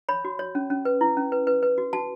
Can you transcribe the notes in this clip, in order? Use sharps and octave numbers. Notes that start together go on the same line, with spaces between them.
C#5 B5
F#4
C#5
C#4
C#4
B4
E4
C#4
B4
B4
B4
F#4
F#4 A5